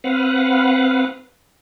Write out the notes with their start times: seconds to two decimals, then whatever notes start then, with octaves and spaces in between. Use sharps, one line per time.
0.04 C4 B4 F5 F#5